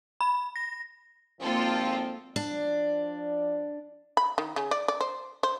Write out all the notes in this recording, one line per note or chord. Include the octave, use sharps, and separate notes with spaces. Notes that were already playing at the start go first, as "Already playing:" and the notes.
B5
A#6
G#1 F3 A#3 C4 F4 A4
F3 D4 D5
B5
D#3
C#3
D5
D5
C5
C5